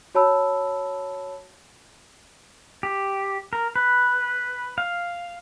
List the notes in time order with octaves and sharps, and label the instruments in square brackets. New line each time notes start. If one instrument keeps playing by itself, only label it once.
[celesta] F#4 C#5 A5 B5 E6
[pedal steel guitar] G4
A#4
B4
F5